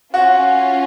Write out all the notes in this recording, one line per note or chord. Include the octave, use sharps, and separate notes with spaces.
C#4 F4 F#4